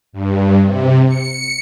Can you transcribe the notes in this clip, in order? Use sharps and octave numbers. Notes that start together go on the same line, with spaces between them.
G2
C3
C#7